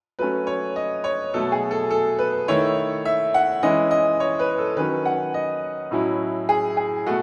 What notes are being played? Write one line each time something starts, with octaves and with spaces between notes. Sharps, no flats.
F#3 A3 C#4 B4
C#5
D#5
C#5
B2 F#3 A3 A4
G#4
A4
A4
B4
D#3 A3 E4 C#5
E5
F#5
E3 G#3 C#4 E4 D#5
D#5
C#5
B4
A4
D#3 F#3 C#4 B4
F#5
D#5
A2 F#3 C#4 E4
G#4
G#4
B2 A3 F#4